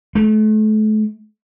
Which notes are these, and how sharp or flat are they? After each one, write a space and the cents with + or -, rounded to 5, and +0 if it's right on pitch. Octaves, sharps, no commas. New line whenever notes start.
A3 -35